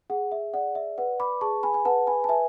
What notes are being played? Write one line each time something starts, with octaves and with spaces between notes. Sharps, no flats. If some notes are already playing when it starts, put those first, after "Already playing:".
G#4 F#5
E5
D5 F#5
E5
B4 F#5
B5 D6
G#4 A5 C#6
G#5 B5
G#5
B4 F#5 A5
G#5 B5
A5
B4 E5 G#5